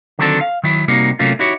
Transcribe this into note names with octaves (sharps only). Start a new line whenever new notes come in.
D3 D#3 F#3 C4 D4 A4
F5
D#3 F#3 E4
C3 G3 A#3 D#4 F#4
C3 F#3 A3 A#3 C#4 F4
D#4 E4 F#4 G4 C#5